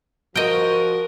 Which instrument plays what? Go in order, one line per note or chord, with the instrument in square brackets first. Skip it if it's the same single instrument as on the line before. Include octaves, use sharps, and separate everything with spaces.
[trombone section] F3 F#4 [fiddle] A#4 [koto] D#5 G5